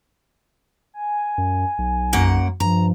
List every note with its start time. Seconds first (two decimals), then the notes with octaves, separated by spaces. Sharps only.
0.94 G#5
1.38 F#2
1.78 B1
2.13 F#2 A#3 F#5
2.60 G2 F3 A#5